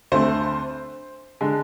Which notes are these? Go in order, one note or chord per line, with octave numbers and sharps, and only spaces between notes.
D2 D3 A3 C4 C5
D3 G#3